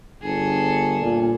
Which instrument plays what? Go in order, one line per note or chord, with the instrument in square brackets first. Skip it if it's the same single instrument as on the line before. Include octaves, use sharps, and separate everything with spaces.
[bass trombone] G1 [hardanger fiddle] G#4 A4
[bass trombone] A#2